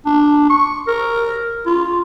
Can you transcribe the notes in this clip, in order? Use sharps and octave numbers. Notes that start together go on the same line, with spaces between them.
D4
C#6
A#4
F4